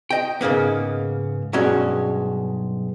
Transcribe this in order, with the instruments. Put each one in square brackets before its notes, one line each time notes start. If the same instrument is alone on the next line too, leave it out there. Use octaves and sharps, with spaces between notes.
[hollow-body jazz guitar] D#5 G5
G#2 C#3 A#3 B3
B1 G2 G#3 C#4 F#4